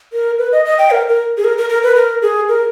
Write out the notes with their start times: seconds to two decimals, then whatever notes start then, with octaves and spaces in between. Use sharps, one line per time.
0.13 A#4
0.38 B4
0.52 D#5
0.65 D#5
0.78 G5
0.91 A#4
1.08 A#4
1.37 G#4
1.44 A#4
1.58 A#4
1.69 A#4
1.83 B4
1.96 A#4
2.22 G#4
2.49 A#4